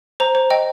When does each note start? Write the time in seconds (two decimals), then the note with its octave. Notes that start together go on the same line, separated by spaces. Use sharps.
0.20 C5 A#5
0.35 C5
0.50 D#5 G5